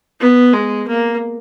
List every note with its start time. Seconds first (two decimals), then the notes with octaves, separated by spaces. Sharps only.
0.20 B3
0.53 G#3
0.88 A#3